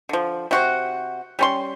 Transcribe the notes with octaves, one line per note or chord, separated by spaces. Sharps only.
D3 F3
C3 F#4 C5
G3 C#4 C6